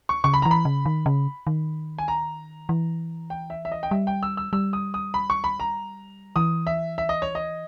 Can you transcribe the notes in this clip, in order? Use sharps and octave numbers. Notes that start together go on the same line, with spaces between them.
C#6
C#3 C#6
B5
E3 A#5
B5
C#3
D#3
C#3
D#3
G#5
A#5
E3
G5
E5
E5
D#5
G5
G3 E5
G5
E6
E6
G3 E6
D#6
D#6
B5
C#6
B5
A#5
E3 D#6
E5
E5
D#5
C#5
D#5